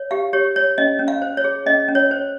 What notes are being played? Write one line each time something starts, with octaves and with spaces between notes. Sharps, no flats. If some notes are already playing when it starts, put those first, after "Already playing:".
Already playing: C#5
G4 F5
G4 C#5
C#5
C#4 D#5
C#4
F5
C5
C#5
G#4
C#4 D#5
C#4
C#5
C5